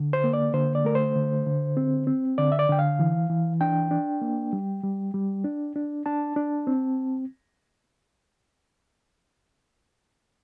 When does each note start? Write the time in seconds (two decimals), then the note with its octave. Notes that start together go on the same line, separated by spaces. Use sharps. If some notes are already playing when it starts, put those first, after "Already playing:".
Already playing: D3
0.13 C5
0.24 A#3
0.33 D5
0.54 D3 C5
0.75 D5
0.85 A3 A#4
0.95 C5
1.15 D3
1.46 D3
1.77 C4
2.07 C4
2.38 D3 D5
2.52 E5
2.59 D5
2.69 D3 G5
2.79 F5
2.99 E3
3.30 E3
3.61 D4 G5
3.91 D4
4.21 A#3
4.53 G3
4.84 G3
5.14 G3
5.44 D4
5.76 D4
6.06 D4 A5
6.36 D4
6.67 C4